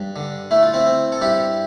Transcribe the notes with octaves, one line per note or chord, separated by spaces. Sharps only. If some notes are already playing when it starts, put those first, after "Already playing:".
Already playing: G2
D3
A3 E4
F4
C4 E4
C4
A4
G2 E4 G4